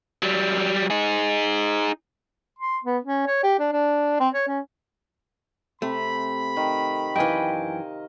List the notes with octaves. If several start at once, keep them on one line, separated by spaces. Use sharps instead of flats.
F#3 G3
D#4 G#4
C6
B3
C#4
C#5
G4
D4
D4
C4
C#5
C#4
C3 A3 B5
D#3
F#2 E3 D#5 F5 G5 G#5